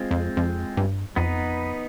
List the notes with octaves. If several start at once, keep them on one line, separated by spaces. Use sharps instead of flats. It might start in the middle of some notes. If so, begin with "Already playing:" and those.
Already playing: G#3 C4 F4
F2
F2
G2
F2 B3 D#4 B4